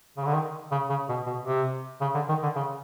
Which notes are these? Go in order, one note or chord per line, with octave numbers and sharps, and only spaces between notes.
C#3
D3
D#3
C#3
C#3
B2
B2
C3
C#3
D3
D#3
D3
C#3